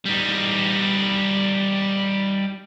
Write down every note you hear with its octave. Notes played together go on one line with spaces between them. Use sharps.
G3 D#4